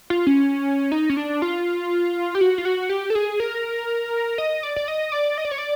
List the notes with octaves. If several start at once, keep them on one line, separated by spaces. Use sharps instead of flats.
F4
C#4
D#4
C#4
D4
F4
G4
F#4
F4
F#4
G4
A4
G#4
A#4
D#5
D5
D5
D#5
D5
D#5
D5
C#5
D5